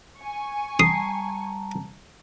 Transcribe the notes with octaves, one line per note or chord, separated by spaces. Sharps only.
G#5 C#6
G3 A5 A#5 D#6 C7